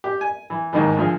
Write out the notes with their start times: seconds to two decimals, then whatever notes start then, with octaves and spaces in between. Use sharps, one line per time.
0.04 G4
0.21 G#5
0.50 E3
0.73 D#2 G#2 D#3 E3
0.97 D2 F3 G#4